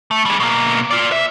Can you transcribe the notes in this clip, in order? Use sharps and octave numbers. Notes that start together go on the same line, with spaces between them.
A3
G3 G#4
B2 A#3
F4 D5
E5